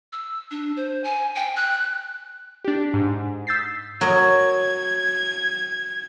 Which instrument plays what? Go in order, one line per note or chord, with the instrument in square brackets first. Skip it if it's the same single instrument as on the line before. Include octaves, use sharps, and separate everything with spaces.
[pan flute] E6
D4
C5
G#5
G5
F#6
[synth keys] D4 G4
G#2
D#6 E6 G6 A6 B6 C7
[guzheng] F#3 A#4 D#5 [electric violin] G#6